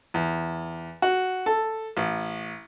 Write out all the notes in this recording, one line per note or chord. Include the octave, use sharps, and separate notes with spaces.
E2
F#4
A4
A1